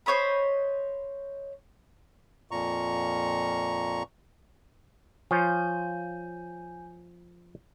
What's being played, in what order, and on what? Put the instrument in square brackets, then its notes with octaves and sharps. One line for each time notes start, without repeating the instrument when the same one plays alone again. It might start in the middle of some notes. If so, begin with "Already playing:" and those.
[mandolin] C5 C#5 D#5 B5
[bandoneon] F2 A#2 A#5 C#6
[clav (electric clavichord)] F3 F4 C#5 [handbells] G#5 G6